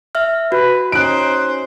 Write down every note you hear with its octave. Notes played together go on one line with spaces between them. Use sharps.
E5 F6
F#4 B4
C#4 D#4 C5 F#6 D7